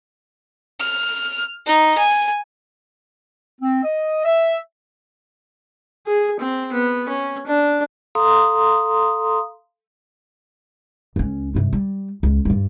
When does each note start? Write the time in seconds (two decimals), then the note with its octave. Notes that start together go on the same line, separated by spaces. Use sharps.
0.81 F6
1.67 D#4
1.98 G#5
3.61 C4
3.84 D#5
4.25 E5
6.07 G#4
6.39 C4
6.72 B3
7.08 C#4
7.47 D4
8.15 A4 F5 A#5 C6 D#6
11.16 C#2 C#4
11.55 G2 C3
11.73 G3
12.23 C#2
12.45 G2 G3